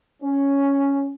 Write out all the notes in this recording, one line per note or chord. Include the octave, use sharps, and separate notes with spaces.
C#4